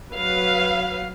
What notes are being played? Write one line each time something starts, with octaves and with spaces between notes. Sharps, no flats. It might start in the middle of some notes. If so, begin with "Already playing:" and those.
F#3 B4 F5